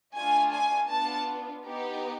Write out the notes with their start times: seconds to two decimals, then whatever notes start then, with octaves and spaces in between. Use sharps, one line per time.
0.14 A3 D4 F4 G#5
0.51 G#5
0.89 B3 D4 F4 A5
1.65 B3 D#4 G4